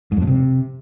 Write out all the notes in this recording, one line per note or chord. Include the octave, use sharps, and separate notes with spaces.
G#2
F2
A2
C3